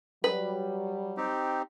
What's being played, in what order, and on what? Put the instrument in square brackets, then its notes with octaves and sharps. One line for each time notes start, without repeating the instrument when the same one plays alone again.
[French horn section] F#3 G3 [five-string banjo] B4
[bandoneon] C4 D#4 G4